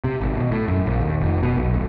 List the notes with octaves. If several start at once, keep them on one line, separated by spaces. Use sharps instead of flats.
C3
G#1
B2
A2
F#2
A#1
D#2
F1
B2
B1
D1